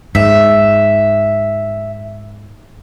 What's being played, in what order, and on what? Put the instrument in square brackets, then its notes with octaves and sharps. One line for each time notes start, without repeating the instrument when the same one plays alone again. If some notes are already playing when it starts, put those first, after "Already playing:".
[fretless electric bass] G#2 [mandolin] E5